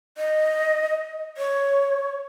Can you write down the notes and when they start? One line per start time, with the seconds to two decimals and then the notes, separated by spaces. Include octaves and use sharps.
0.17 D#5
1.37 C#5